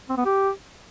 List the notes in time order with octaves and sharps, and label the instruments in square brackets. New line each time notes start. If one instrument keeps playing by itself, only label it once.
[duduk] C4
B3
G4